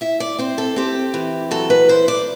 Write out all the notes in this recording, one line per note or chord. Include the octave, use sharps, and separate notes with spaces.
E4 E5
D5
C4 C5
A4
C4 G4
E3
F#3 A4
B4
E4 C5
D5